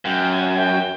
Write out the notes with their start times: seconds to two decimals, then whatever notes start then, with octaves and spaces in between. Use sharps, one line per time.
0.05 F#2 G5
0.31 G#5
0.56 G5